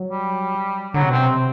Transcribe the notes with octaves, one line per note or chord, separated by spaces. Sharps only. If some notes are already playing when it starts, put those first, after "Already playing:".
Already playing: F#3
G3
D3 F#3
C3
B2 C4
C3